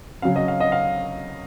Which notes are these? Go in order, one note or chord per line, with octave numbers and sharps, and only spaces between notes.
C#3 F#3 C#4 F5
D#5
F5
D#5
F5